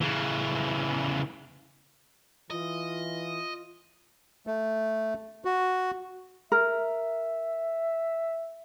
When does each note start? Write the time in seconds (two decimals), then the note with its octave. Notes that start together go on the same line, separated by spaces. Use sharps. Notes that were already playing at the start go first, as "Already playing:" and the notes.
0.01 C#3 E3
2.51 E3 F4 D#5
4.47 A3
5.45 F#4
6.52 A#4 E5